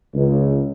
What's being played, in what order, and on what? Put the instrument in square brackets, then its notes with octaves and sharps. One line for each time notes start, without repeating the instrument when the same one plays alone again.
[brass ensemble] C#2